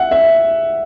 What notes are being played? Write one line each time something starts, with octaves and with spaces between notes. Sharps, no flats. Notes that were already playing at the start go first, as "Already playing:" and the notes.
Already playing: E5 F#5
E5